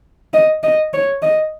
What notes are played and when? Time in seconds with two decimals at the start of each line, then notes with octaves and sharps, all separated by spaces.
0.33 D#5
0.63 D#5
0.93 C#5
1.22 D#5